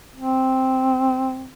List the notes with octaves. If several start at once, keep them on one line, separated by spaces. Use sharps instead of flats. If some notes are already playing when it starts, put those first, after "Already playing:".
C4